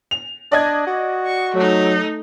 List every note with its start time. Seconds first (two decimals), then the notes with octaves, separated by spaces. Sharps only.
0.11 F7
0.52 D4 D5 D#5 G#6
0.87 F#4
1.26 C#6
1.55 F#3 A3 D#4